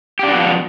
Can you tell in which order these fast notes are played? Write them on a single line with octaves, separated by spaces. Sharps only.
G4 D4 F#4 B3 F3